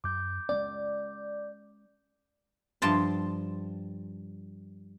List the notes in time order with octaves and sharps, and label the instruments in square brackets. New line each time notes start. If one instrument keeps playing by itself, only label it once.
[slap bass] F#2 [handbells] D6 G6
[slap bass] G#3 A#3 C#4 [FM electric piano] D5
[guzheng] G2 F3 A5 C6